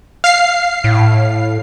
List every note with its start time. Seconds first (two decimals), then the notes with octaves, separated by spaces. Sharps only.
0.24 F5 C7
0.84 A2